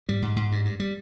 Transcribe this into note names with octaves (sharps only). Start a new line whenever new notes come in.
G#2 G3
G#2
G#2
G2
G2
G3